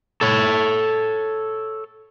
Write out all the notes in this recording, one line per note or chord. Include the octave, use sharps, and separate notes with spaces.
A4 C#5